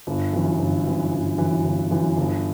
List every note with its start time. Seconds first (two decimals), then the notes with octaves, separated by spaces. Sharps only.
0.07 G1
0.33 F#2 E3
0.59 G1
0.86 F#2 E3
1.12 G1
1.38 F#2 E3
1.65 G1
1.91 F#2 E3
2.17 G1